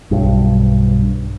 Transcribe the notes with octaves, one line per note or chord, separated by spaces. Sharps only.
B1 G2